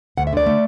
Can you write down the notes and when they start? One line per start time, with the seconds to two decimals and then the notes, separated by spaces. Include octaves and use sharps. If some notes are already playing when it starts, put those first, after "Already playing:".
0.18 D2 F#5
0.27 E5
0.33 D3 D5
0.46 A3